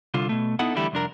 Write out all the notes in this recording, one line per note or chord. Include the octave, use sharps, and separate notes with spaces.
C2 D3 F4
B2 A3
B3 D#4 E4 A4 F#5
D3 E3 G3 A3 E4 G4
C2 F2 D4 A#4